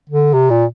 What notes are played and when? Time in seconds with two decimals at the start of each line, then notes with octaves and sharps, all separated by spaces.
0.09 D3
0.34 C3
0.50 A#2